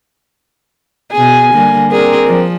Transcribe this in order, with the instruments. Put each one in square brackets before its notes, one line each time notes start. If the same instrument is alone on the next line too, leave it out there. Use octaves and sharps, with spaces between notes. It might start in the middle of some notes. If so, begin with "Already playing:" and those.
[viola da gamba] B2 G#4 [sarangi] G#5
[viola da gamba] D3 G3 A#3
[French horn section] C4 A#4 [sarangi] D4 [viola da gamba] G#4
[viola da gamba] F3